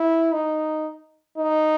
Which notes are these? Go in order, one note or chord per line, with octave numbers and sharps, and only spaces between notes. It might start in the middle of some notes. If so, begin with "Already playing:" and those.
Already playing: E4
D#4
D#4